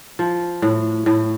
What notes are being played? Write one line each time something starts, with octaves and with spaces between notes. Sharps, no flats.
F3
A2
A2